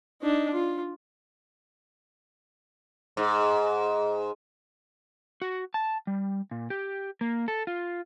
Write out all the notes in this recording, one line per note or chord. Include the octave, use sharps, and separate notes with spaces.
D4 D#4
F4
G#2
F#4
A5
G3
A#2
G4
A#3
A4
F4